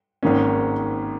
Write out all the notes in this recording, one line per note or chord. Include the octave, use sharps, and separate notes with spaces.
G#1 G#2 D#3 A#3 C#4